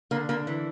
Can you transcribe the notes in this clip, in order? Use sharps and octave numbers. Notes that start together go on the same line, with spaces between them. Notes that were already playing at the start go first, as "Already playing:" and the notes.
D3 A#3
D3 A#3
E3